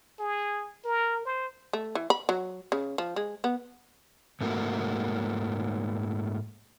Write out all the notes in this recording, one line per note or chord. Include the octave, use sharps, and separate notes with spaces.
G#4
A#4
C5
A3
E3
B5
F#3
C#3
F3
G#3
B3
G#2 A3 A#3 F#4